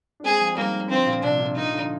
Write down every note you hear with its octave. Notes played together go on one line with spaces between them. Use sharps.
D4
G#3 C4 G#4
F3 G#3
D#3 G3 A#3
D3 F3 C4
A#2
C3 D4
A#2 D3
A#2 D3 D#4
D3 F3